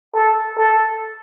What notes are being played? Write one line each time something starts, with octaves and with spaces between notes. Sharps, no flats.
A4
A4